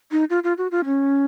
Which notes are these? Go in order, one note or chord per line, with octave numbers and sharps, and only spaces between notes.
D#4
F4
F4
F#4
F4
C#4